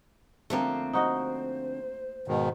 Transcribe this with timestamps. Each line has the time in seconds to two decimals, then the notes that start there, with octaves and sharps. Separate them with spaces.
0.50 D3 F3 A3 A#3 C4
0.93 D#4 F#4 C5 D#5
2.28 G#2 B2 D#3